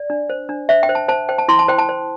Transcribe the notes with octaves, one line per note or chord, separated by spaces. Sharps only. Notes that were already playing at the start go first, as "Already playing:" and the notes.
Already playing: D5
D4
C5
D4
C5 E5
G5
C5
A5
C5 A5
C5 G5
A5
E4 C6
A5
C5 G5
A5
C5